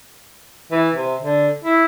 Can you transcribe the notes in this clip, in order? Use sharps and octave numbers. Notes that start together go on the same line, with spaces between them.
E3
C3
D3
E4